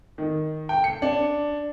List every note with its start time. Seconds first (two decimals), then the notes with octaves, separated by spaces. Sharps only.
0.18 D#3
0.69 G5
0.84 C#7
1.02 D4